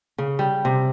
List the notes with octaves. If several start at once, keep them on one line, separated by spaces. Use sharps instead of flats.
C#3
G3
C3